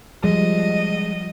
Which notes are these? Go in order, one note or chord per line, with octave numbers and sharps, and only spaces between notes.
F3 G3 G#3 D#5